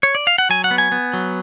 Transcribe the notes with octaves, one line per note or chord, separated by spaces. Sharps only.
C#5
D5
F5
F#5
F#3 G#5
F#5
B3
G#5
B3
F#3